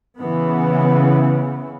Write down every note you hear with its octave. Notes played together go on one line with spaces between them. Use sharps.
C#3 E3 B3